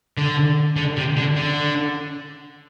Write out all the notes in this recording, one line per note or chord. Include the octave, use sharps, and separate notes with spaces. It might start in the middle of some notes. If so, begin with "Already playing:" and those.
D3
D3
C3
D3
D3